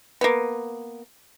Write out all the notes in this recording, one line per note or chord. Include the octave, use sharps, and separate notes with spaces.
A#3 B3